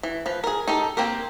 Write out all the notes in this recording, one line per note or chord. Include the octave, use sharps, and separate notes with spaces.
E3
F3 B4
G#4 A#4
D#4 G4 A4
A#3 C4 G4 A#4